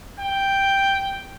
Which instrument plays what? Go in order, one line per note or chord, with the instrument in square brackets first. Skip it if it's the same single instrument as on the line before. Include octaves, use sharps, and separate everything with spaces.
[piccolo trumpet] G5